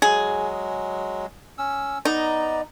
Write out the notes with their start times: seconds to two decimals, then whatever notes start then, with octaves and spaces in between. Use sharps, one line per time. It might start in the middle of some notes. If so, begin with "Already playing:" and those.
0.02 F#3 G#3 G#4
1.58 C#4 E6
2.05 B3 D#4 D5 A#5